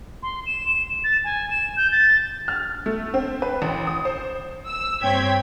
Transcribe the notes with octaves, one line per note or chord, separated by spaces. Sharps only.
C6
E7
A6
G#5
E7
G6
A6
F6
A3
C4
B4
A1
D#6
C5
E6
G2 C4 C#5 G5 G#6 B6